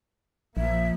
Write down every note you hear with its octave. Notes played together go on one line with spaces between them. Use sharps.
A#1 F3 A#3 E5